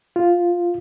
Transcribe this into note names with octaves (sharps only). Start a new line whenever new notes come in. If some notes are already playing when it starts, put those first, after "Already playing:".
F4